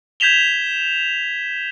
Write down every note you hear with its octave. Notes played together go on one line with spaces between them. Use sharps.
G6 G#6 B6 E7 F7 G7